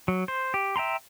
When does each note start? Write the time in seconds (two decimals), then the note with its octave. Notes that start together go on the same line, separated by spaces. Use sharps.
0.08 F#3
0.28 C5
0.54 G4
0.76 E5 G5 A#5 C6